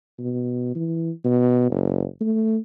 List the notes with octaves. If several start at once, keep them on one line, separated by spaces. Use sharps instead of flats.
B2
E3
B2
F#1
A3